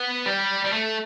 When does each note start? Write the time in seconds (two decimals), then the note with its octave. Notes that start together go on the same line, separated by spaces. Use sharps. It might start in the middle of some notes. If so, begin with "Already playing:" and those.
Already playing: B3
0.26 G3
0.65 G3
0.73 A3